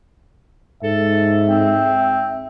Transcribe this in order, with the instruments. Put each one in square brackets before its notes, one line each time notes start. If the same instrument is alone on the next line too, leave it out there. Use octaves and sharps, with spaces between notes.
[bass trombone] G#2 [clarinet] A4 [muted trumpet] E5
[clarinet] C4